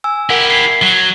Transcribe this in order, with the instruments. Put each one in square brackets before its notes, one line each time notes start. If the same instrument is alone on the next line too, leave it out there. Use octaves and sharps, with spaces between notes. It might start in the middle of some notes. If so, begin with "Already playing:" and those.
[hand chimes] G#5 E6
[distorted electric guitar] E4 G4 [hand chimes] A#4 F#5
[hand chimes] G#6 B6 C7
[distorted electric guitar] F#3